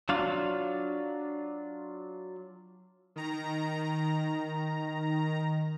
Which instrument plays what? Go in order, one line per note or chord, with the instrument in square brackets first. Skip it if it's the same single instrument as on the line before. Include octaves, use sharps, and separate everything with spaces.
[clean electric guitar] F#3 D4 F4 F5
[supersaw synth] D#3 A#5